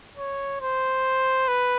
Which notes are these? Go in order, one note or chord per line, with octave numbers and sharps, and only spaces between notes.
C#5
C5
B4